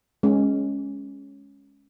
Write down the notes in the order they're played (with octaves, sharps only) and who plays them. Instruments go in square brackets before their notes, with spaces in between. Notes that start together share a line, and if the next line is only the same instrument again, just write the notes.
[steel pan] G#3 C#4